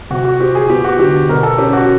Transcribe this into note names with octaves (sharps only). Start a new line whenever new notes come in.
C3 F#4
F#4
C4 G4
G#4
B3 G4
F#4
D3 G4
B2 A#4
A4
C#4 G4
F#4